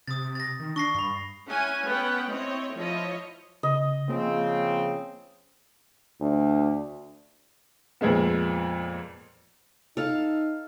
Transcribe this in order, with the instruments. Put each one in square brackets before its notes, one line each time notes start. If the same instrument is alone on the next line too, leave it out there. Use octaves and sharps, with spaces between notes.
[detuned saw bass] C3 [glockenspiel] D#6 A6
[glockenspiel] A6 A#6
[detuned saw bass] D#3
[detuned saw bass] D4 [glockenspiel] C#6 A#6 C7
[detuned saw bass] G2 [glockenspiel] B5 C7
[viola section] C#4 E4 F#5 G#5
B3 C#4 B4 F#5 G5
C4 E4 C#5 D#5
F3 E4 F4 C#5 D#5
[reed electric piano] C#3 [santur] D#5
[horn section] C#3 F3 C4 [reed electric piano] A#3
[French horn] D2
[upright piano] F2 A#2 G#3 B3
[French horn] D#4 [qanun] A4 F5